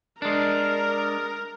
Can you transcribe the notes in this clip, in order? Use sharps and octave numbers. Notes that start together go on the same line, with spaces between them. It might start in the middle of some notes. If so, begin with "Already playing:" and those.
G#3 D4 A#4